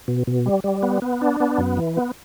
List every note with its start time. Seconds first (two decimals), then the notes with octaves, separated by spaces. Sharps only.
0.08 B2
0.27 B2
0.46 G3
0.64 G3
0.83 B3
1.02 B3
1.21 D4
1.40 B3
1.58 F#2
1.77 E3
1.97 B3